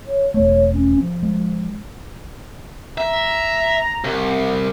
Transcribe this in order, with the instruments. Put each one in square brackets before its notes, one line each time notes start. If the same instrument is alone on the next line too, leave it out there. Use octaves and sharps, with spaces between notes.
[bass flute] C#5
[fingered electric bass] E1 A3 [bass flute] C#5
[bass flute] C#4
F3
[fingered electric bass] G#3
[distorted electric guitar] E5 [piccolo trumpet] A#5
[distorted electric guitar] C2